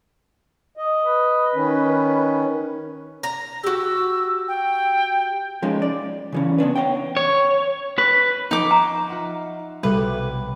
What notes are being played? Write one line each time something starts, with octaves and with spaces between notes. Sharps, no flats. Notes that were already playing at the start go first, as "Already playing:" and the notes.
D#5
B4
D#3 C#4
A#5
F#4 G4 E6
G5
F3 G#3 C#4 D#4
D5
C#3 E3 C#4
B3 C#4 D4 B4
C#5 D#5 F#5 G5
C#5
B4
F3 D#4 B4 D6
A#5 C6 C#6 C#7
F4 E5 F#5
B1 C3 G3 F#4 A4 B4